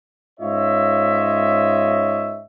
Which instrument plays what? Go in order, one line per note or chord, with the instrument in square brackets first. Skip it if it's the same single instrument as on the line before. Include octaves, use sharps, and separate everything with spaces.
[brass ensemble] G#2 C#4 F4 C#5 D#5 E5